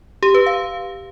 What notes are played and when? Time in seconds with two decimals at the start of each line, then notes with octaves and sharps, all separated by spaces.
0.23 G4
0.34 B4
0.46 F5